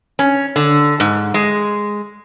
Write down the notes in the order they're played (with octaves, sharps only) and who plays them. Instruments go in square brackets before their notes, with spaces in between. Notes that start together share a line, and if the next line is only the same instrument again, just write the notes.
[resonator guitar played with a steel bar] C#4
D3
G#2
G#3